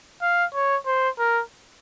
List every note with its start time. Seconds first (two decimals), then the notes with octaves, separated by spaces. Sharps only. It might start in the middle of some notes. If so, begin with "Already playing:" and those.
0.22 F5
0.54 C#5
0.87 C5
1.19 A#4